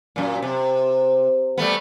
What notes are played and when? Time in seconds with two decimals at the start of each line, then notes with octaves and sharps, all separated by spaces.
0.16 F#2 A#2
0.43 C3
1.58 G3 A3 B3